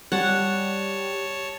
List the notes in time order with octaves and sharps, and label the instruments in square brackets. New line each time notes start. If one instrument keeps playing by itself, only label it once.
[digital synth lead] G3 [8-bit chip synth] C#5 A5 [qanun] F#5